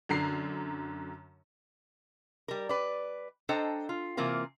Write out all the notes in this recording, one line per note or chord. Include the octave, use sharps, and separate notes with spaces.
F#2 D3 A#5 C7
G3 A#4
B4 D5
D4 A4 C5 D#5 G5 A#5
F4
C3 E3 A#3 C4 F4 A#4